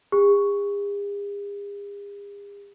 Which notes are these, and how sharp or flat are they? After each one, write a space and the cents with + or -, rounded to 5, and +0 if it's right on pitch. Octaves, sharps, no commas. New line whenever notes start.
G#4 -45